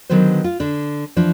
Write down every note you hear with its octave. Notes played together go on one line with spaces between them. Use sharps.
D3 D#3 F#3 B3 B4 C5
F4
D3 D4
E3 F3 D4